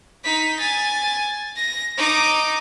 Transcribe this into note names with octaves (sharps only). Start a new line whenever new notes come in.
D#4 B6
G#5 A6
A#6
D#4 D6